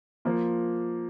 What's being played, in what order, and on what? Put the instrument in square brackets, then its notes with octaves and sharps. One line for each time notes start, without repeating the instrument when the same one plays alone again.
[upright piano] F3 A#3 F4